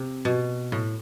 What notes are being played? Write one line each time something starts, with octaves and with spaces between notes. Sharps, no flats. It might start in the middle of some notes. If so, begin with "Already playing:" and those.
Already playing: C3
B2
A2